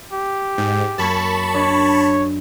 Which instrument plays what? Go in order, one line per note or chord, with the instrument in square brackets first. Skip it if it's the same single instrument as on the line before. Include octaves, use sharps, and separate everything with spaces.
[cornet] G4
[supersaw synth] G#2 [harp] G#4 G#5 G6
[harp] F#2 A#3 G#6 [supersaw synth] A5 B5 C#6
[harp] D4 D#5 [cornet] C#5